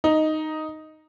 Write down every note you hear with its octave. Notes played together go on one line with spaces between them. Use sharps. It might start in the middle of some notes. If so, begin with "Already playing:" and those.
D#4